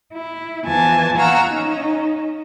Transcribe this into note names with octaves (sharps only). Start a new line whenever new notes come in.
E4
E2 E3 F3 G#5 A5
F5 F#5 A#5 C#6 E6 F6
C#4 D#4